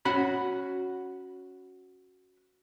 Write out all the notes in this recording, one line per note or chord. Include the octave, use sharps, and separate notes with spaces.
C#4 F#4 F#5 B5